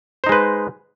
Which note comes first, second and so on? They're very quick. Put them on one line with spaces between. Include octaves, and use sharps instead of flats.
C5 D#4 G#3 B4